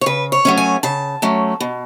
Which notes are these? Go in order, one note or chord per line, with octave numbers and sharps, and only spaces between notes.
C#5
C#3 B4
C#5
F#3 A3 C#4
G#5
C#3 A5
F#3 A3 C#4
B2